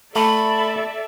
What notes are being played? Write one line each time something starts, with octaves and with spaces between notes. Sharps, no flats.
A3 A4 D5 E5 B5